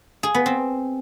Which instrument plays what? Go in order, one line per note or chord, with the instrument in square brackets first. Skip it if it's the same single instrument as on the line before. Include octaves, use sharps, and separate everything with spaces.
[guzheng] G#4
B3
C4